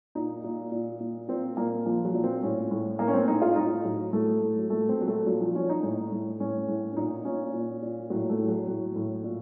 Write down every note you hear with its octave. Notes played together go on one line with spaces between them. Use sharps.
A#2 D#4
A#2
A#2
A#2
A#2 C4
A#2 A#3
A#2 F3
F#3
A#2
C4
A2 C#4
A2
A2 A#3
C#4
C4
A2 D#4
F4
A2 D#4
A2 F#3
A2 A3
A2
F#3
A#2 A3
C4
A#2 F#3
A3
A#2 F#3
F3
A#2 C#4
D#4
A2
A2
A2 C#4
A2
C#4
A#2 D#4
A#2 C#4
A#2
A#2
A2 F#3
A3
A2
F#3
A2
A2
A#2